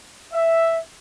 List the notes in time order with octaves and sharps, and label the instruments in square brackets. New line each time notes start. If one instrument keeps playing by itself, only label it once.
[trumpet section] E5